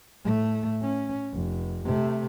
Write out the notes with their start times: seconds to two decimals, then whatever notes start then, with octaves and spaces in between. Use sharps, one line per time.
0.23 A2 A3
0.82 C#4
1.32 F1
1.84 C3 A3